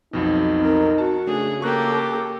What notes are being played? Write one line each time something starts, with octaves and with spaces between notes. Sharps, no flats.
B1 F2 B2 D#4
C4 A#4
F#4 A5
C#3 A3 D4 G#4
A#3 G4 A4 C#6 F#6